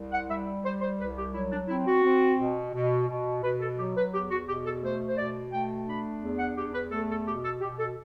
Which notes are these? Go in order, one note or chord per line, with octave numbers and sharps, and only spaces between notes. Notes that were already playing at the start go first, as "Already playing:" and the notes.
Already playing: C2
F#5
G3 E5
G3 C5
C5
C2 B4
G4
F#3 E4
D4
C4 E4
F#4
C4
B2
B2
B2
B2 B4
A4
F#3 G4
B4
E2 G4
F#4
B2 G4
A4
A3 C5
C5
B2 D5
A3 G5
D4 B5
E2
F#5
E2 G4
B4
A3 A4
A4
B2 G4
A4
B2 G4
A4